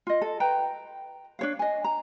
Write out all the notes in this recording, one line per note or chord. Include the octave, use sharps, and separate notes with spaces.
F4 D#5
A4
B4 G5 A#5
D4 C#5 F5
D#5 G#5
A#5